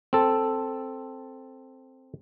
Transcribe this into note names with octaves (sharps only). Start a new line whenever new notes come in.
C4 A4